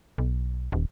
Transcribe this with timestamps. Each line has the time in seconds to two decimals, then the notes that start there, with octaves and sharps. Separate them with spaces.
0.18 B1
0.72 D#1